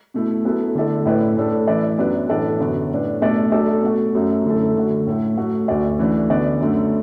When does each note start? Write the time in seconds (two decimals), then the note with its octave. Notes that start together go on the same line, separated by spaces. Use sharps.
0.14 B2 A3 E4
0.45 F#3 B3 E4 A4
0.75 D3 A3 E4 A4 D5
1.06 A2 A3 E4 B4 D5
1.37 A2 A3 D4 A4
1.67 E3 A3 E4 B4 D5
1.98 F#2 F#3 B3 D4 B4
2.29 A2 E3 D4 A4 D5
2.60 F#2 D3 B3 F#4
2.92 A2 A3 D4 B4
3.21 B2 A3 D4 A4 D5
3.52 F#3 A3 D4 A4 D5
3.83 B2 A3 F#4
4.14 F#2 F#3 A3
4.45 F#2 D3 A3 E4 A4
4.76 D3 A3 F#4
5.07 A2 A3 E4
5.37 F#3 A3 F#4
5.68 D2 D3 A3 F#4 D5
5.99 E3 A3 D4
6.30 D3 B3 F#4 D5
6.60 F#2 D3 A3